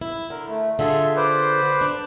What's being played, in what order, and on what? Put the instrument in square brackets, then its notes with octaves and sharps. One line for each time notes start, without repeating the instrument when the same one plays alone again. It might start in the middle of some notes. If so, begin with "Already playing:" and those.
[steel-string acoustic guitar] E4
[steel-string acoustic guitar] D3 [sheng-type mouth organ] A#4
[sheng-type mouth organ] A3
[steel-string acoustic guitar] D3 F4 G#4 [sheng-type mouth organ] A4 E5
[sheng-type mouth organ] B4 C5 D5
[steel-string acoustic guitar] D4